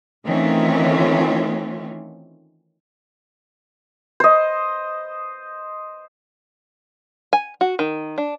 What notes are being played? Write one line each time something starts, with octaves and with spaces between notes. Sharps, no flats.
D#3 E3 A3 C4 C#4 F4
C5 D#5
G#5
F#4
D#3
D4